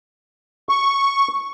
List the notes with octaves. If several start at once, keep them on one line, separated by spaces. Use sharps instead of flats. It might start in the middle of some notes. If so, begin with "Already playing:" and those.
C#6